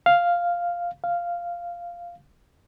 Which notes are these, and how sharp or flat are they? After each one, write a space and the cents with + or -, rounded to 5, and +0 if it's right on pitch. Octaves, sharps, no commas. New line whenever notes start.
F5 +0
F5 -5